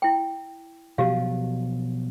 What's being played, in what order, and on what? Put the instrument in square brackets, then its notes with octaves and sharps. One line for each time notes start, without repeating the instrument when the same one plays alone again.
[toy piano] E4 G5
[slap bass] B2 F3 F#3 [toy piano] F#4 G4 F5